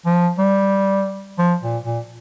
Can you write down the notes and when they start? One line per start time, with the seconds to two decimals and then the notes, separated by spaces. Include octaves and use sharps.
0.06 F3
0.38 G3
1.38 F3
1.62 A#2
1.84 A#2